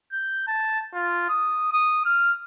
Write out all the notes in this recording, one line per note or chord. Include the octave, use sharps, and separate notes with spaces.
G6
A5
F4
D#6
D#6
F6